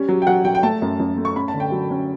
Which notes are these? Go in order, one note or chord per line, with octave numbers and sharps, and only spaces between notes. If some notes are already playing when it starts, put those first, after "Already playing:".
Already playing: G3 C#4
F#3
G5
F#3 F#5
F#3 G5
G5
A3 A5
F#2
F#2
A3
C#6
C#4 B5
A5
D3
G5
F#3
C#4